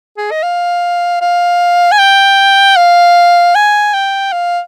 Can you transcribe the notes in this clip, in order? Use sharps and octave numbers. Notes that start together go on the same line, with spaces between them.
G#4
D#5
F5
F5
G#5
G5
F5
G#5
G5
F5